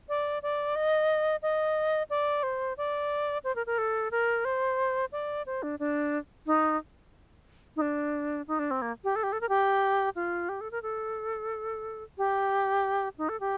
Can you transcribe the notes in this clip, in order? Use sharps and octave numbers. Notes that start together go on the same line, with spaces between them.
D5
D5
D#5
D#5
D5
C5
D5
C5
A#4
A#4
A4
A#4
C5
D5
C5
D4
D4
D#4
D#4
D4
D#4
D4
C4
A#3
G4
A4
G4
A4
A#4
G4
F4
G4
A4
A#4
A4
G4
D#4
A4
G4